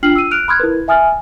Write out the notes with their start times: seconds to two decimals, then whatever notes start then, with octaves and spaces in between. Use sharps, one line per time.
0.03 D4 F4 G5 F6 C7 F#7
0.16 E6 D#7
0.31 F6 F#6 D7 F7
0.48 B5 C6 D#6 F6 F#6 G#6
0.60 E4 A#4 B4
0.88 E5 G#5 D#6 F6 A6